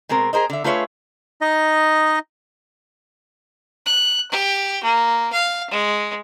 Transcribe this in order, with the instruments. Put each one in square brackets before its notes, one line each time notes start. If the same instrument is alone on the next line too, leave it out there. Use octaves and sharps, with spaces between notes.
[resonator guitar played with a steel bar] B2 G#3 C4 A#4
G#4 A#4 C5 D#5
D3 E5
A3 F4 G#4 B4 C#5 E5
[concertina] D#4 D#5
[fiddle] F#6
G4
A#3
F5
G#3